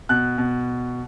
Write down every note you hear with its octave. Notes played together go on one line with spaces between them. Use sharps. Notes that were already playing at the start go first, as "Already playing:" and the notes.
B2 F#6
B2